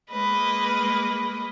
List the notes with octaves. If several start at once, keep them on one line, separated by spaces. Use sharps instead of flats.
G#3 A#3 B4 D#5